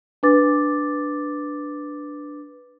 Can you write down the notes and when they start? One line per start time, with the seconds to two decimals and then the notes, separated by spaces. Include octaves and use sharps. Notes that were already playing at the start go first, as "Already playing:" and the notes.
0.23 D4 B4 D6 A6